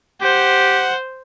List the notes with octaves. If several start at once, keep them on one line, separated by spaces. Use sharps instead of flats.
G4 C5 F#5